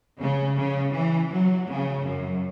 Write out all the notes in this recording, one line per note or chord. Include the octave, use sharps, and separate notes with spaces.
C#3
C#3
E3
F#3
C#3
F#2